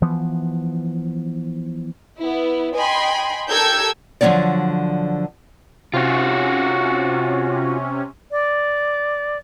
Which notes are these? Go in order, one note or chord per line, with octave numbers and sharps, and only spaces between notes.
E3 F3 B3
B3 E4
D#5 G5 G#5 B5 C6
G4 A4 A#4 E6 G6 G#6
D3 F3 F#3 C#4 C#5 D5
C3 C#4 F4 F#4
D5